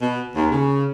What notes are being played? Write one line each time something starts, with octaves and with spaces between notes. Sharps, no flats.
B2
D#2
C#3